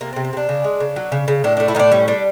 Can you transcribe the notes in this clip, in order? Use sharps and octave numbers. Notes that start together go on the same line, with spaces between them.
C3 A#3
C4
C3
C4
C3 D4
C#3
G#3
C#3
F#3
C#3
C#3
A2 D4
A3 D4
E4
A2 D4 D#4
G3 C#4
G3 D4